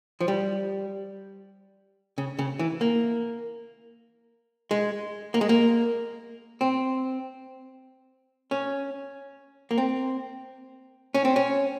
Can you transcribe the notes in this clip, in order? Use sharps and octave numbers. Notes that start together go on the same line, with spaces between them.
F3
G3
C#3
C#3
E3
A#3
G#3
A#3
G#3
A#3
C4
C#4
A#3
C4
C#4
C4
C#4